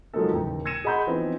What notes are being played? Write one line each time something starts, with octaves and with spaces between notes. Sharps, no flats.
F3 F#3 G#3 A#3 D#4 A4
D#2 A2 C#3 E3 G5 A#5
E6 G#6 A#6 C#7 D#7 E7
G#4 D#5 F#5 B5 C6 G6
E3 F3 B3 C4 D#4